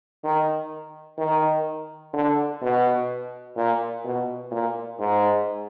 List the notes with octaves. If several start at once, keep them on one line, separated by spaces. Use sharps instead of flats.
D#3
D#3
D3
B2
A#2
B2
A#2
G#2